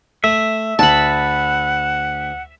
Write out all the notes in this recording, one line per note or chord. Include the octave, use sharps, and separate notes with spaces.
A3 E5
D2 F#5 A5 B5